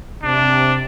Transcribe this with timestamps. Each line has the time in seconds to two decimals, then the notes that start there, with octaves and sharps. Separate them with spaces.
0.24 C3 D4